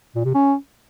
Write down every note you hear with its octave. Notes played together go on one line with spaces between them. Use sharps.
A#2
C3
C#4